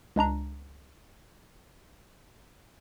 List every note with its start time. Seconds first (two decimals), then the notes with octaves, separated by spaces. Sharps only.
0.16 C#2 G#3 D4 A#5